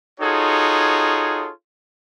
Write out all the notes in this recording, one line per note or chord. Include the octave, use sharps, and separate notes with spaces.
D#4 F4 F#4 G#4 A4 C#5